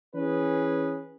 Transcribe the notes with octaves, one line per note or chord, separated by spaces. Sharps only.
E3 C#4 G#4 B4